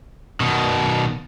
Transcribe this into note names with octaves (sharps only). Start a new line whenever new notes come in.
B2 D#3